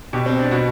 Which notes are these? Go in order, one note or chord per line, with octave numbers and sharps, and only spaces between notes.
B2 G4
C4
D4
B2 F#4